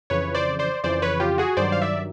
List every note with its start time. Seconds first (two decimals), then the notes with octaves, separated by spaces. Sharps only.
0.10 F2 C#3 E3 B4 C#5
0.35 C5 D5
0.59 C5 D5
0.84 F2 C#3 E3 C5 D5
1.02 B4 C#5
1.20 F4 G4
1.38 F#4 G#4
1.57 G2 D#3 F#3 C5 D5
1.72 F5
1.82 D5 E5